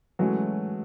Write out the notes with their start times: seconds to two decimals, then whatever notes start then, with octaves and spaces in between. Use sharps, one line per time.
0.19 E3 F#3 G#3 A3 C#4 F#4